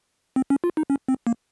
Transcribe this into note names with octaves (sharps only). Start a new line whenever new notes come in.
C4
C#4
F4
D#4
C#4
C4
A#3